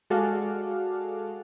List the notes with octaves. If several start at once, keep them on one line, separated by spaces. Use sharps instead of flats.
G#3 F#4 G#4 A4 D5 F5